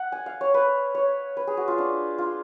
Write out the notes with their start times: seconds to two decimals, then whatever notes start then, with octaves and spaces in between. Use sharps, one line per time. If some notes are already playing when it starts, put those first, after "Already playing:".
Already playing: F#5
0.12 G#5
0.26 F5
0.41 C#5
0.54 B4
0.95 C#5
1.37 B4
1.47 G#4
1.57 F#4
1.68 F4
1.78 D4
2.18 F4